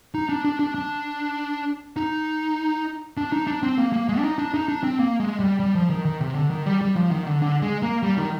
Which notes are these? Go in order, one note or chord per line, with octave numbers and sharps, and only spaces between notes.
D#4
D4
D4
D4
D4
D#4
D4
D#4
D4
C4
A#3
A#3
G#3
D4
D#4
D4
D#4
D4
C4
A#3
G#3
G3
G3
F3
D#3
D#3
C3
D3
D#3
G3
G3
F3
D#3
D3
D3
G#3
A#3
G3
D#3